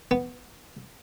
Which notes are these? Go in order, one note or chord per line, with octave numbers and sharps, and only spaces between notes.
B3